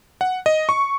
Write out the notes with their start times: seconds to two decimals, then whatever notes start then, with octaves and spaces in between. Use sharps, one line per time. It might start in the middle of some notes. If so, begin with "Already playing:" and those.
0.21 F#5
0.46 D#5
0.69 C#6